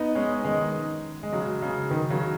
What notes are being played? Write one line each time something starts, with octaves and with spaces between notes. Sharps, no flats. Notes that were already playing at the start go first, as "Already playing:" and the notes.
Already playing: B3 D#4
G#3 C#4
D#3 G#3
G#3
C#3 F#3
C#3
D#3
C#3 F#3